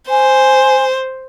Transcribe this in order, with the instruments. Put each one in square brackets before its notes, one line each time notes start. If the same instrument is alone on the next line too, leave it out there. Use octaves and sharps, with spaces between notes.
[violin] C5 [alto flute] G#5